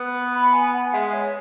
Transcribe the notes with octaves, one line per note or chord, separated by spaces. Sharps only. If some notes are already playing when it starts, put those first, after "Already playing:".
Already playing: B3
B5
G#5
F#5
G#3 E5
C#5